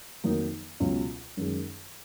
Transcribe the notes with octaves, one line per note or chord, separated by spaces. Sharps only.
F2 D#3 F#3 A#3 D#4
C#2 B2 F#3
F#2 D#3 G#3